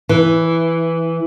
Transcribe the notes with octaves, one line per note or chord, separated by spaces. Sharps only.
E3